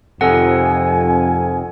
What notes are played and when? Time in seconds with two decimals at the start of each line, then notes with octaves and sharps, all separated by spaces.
0.21 F2 C3 D#3 A4 F#5 G#5